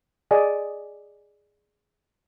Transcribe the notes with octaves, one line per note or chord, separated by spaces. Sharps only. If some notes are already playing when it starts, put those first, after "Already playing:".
G#4 D5 D#5 G#5